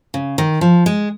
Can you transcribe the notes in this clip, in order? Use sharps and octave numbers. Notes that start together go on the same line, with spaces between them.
C#3
D#3
F3
G#3